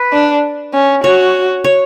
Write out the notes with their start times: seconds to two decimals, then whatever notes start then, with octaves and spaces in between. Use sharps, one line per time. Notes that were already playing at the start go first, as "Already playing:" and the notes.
Already playing: B4
0.13 D4
0.74 C#4
1.04 F#4 C#5
1.64 C#5